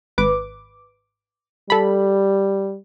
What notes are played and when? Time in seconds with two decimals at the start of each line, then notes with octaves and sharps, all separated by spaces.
0.18 G#1 B4 D6
1.70 G3 A4 B5